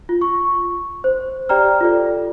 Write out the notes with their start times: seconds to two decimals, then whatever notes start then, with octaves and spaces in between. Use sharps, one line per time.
0.09 F4
0.21 C#6
1.04 C5
1.49 G4 D5 G5 A#5 F6
1.81 F4 A4 D5